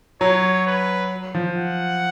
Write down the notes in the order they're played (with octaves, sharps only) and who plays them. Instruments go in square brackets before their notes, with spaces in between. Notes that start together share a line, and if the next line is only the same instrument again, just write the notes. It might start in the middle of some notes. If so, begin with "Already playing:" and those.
[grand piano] F#3 [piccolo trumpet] C#5
[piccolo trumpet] B4
[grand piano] F3
[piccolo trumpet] F#5